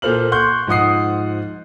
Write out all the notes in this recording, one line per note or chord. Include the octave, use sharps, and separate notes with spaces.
A#2 A4 C5 F6 F#7
C6 C#6 F#6 G6
G#2 F3 F#5 D#6 C7